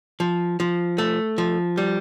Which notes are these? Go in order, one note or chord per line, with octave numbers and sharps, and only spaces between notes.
F3
F3
A3
F3
G3